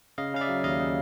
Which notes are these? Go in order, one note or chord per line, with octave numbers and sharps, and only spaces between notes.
C#3 D#5 F5
C#3 F5
D5 E5
F#3
D#2 D#5 F5
C#3